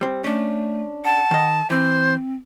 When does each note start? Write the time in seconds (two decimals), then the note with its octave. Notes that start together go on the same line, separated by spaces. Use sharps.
0.01 G3 C4
0.24 A3 C#4 D4
1.05 F#5 A5
1.31 D#3 D#5
1.70 E3 C4 C5